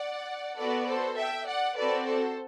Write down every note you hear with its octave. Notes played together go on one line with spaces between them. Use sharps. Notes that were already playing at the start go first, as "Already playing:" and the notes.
Already playing: D5 F#5
B3 F#4 A4 B4 D5
A4 C5
E5 G5
D5 F#5
C4 F#4 A4 B4 D5
A4 C5